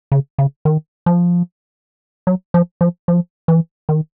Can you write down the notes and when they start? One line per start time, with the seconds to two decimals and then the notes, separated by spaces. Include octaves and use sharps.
0.12 C#3
0.38 C#3
0.65 D#3
1.06 F3
2.27 F#3
2.54 F3
2.81 F3
3.08 F3
3.48 E3
3.89 D#3